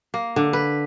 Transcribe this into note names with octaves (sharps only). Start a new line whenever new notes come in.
A#3
D3
B4